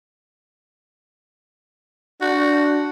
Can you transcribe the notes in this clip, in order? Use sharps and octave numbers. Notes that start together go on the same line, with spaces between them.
D4 F#4